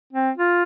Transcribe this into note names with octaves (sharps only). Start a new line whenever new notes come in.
C4
F4